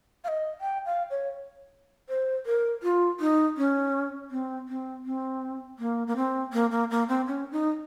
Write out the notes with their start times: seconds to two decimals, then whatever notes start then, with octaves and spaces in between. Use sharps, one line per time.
0.24 F5
0.28 D#5
0.61 G5
0.86 F5
1.10 C#5
2.09 C5
2.46 A#4
2.83 F4
3.20 D#4
3.57 C#4
4.31 C4
4.68 C4
5.05 C4
5.79 A#3
6.07 A#3
6.16 C4
6.53 A#3
6.71 A#3
6.91 A#3
7.08 C4
7.27 C#4
7.52 D#4